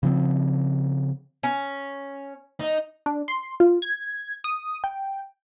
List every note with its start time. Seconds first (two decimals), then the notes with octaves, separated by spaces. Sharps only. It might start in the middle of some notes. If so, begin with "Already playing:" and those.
0.03 C#3 F3 C4
1.43 C#4
2.60 D#4
3.06 D4
3.28 C6
3.60 F4
3.82 G#6
4.44 D#6
4.84 G5